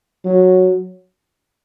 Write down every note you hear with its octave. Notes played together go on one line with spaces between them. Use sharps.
F#3